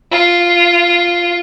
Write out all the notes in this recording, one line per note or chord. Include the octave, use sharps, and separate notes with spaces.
F4